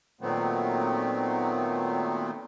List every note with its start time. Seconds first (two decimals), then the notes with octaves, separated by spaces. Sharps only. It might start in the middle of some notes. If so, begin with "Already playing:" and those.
0.21 A#2 D#3 F#3 A3 B3 C4